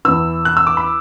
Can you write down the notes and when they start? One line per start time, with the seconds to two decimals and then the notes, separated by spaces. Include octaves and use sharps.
0.05 E3 E6
0.08 E2
0.45 F#6
0.57 E6
0.67 D6
0.77 B5